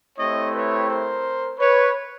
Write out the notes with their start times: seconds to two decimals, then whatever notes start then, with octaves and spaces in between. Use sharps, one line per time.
0.18 A3 C4 E4 G4 C#5 D#5
0.53 B4 C#5
0.89 A#4 C5
1.59 B4 C#5